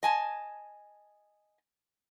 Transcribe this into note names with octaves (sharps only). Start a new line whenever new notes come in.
D#5 G#5 A5